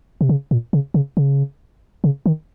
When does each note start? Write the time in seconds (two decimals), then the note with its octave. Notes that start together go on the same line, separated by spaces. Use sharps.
0.21 C3
0.29 C#3
0.51 A#2
0.73 C#3
0.94 C#3
1.17 C#3
2.04 C#3
2.26 D#3